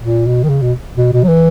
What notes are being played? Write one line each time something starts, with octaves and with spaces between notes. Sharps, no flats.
A#2
B2
D#3
C#3
B2
B2
B2
F#3
E3